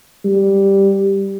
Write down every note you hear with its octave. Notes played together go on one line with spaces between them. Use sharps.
G3